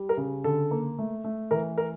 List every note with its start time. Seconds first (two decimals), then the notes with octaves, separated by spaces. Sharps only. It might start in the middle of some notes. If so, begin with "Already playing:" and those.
Already playing: G3
0.09 A#4
0.17 C#3
0.44 D3 A4
0.71 A#3
0.99 A3
1.24 A3
1.51 E3 A#4
1.78 A#4